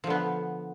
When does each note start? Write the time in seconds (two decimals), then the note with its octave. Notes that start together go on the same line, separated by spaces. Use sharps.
0.04 F3
0.07 D3
0.10 B3